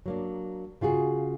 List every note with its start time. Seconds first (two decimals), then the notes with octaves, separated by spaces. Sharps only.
0.06 F#3 A#3 D4
0.81 C#3 F4 F#4 G#4